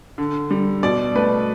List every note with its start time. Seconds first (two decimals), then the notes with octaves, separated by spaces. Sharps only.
0.18 D3
0.51 G3
0.83 B2 D5
1.15 A3 B4